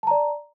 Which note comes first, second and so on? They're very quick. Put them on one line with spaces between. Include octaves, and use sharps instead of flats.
A5 A#5 D5